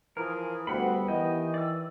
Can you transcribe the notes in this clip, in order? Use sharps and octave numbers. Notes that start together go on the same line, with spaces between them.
E3 F3 G#4 A#4
D2 G3 B3 C4 F#5 B5
D#3 E3 G4 D#5 G5
D5 E6